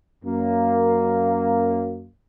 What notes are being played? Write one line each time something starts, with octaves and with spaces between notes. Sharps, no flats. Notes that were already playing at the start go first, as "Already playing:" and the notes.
F#2 A#3